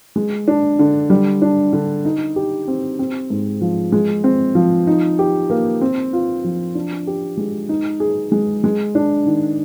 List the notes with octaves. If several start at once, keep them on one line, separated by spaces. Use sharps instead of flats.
G#3
D4
D3
G3
D4
D3
D#4
G4
C4
C4
G#2
F3
G#3
C4
F3
D#4
G4
A#3
C4
F4
F3
D4
G4
G#3
D#4
G#4
G#3
G#3
D4
D#3